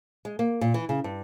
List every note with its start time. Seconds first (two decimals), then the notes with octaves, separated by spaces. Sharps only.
0.25 G#3
0.39 A#3
0.61 A#2
0.74 E3
0.89 C#3
1.04 G2